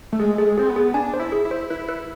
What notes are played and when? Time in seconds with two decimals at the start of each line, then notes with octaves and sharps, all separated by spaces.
0.13 A3
0.20 G#3 G#4
0.38 A3 G#4
0.45 G#3
0.58 C4 G#4
0.70 B3
0.76 G#4
0.94 D4 G#5
1.14 C5
1.20 E4
1.32 G#4
1.45 E4
1.51 C5
1.70 E4 B4
1.89 B4